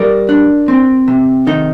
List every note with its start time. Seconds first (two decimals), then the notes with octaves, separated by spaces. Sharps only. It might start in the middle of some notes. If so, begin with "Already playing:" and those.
Already playing: G3 A#4 D5
0.29 D4
0.68 C4
1.08 C3
1.47 D#3 D#4